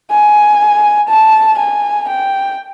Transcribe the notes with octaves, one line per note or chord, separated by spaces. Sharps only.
G#5
A5
G#5
G5